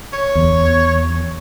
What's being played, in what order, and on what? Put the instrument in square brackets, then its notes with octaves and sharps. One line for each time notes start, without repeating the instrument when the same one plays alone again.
[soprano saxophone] C#5
[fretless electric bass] E2